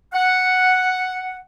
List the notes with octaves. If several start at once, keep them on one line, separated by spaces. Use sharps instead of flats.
F#5